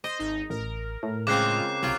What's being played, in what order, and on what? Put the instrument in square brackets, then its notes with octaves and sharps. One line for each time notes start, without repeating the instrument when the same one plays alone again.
[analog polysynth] C5 [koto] D#5
[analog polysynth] G#1 D#4
[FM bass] A1 [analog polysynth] A#4
[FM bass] A2
[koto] C#3 A#3 C4 [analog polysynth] G#3 F4 [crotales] D6 F#6 C7
[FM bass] C2 [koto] F#3 F4 [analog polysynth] G5 G#6